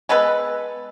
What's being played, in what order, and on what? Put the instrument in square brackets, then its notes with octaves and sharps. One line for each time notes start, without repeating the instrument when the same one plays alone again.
[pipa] G#3 B3 A4 B4